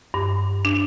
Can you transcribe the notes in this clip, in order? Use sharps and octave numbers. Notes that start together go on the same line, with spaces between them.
G2
D4